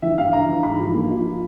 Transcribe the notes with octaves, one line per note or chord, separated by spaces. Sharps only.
E3 E5
G2 F5
G2 A#5
E3
G#2 B5
F3
A#3
F3